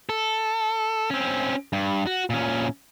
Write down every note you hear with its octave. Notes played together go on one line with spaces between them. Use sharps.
A4
C4 C#4
G2
F#4
A#2 C#4